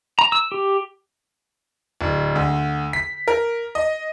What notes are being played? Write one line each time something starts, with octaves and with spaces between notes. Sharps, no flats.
A#5
E6
G4
D1
D2
B6
A#4
D#5